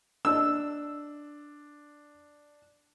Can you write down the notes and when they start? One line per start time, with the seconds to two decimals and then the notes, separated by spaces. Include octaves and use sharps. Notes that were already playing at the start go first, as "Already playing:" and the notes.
0.25 D4 E6